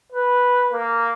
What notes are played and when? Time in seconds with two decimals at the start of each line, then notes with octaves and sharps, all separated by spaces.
0.12 B4
0.71 A#3